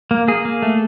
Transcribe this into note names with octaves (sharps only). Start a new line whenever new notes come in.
A#3
A#3 G#4
A#3
A3